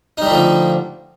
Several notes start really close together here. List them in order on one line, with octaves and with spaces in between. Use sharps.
D#4 G3 A3 F3 D3